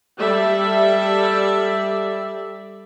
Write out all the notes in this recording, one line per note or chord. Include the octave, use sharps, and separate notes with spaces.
G3 A4 D5 E5